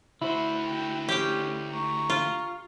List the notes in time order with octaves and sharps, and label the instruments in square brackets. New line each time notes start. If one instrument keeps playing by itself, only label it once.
[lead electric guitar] D2 F#4 [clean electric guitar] E4 [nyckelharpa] C5 E5
[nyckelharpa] G5
[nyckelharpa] C#4 C5 [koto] G4 G5
[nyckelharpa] A#5 C#6
[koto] F4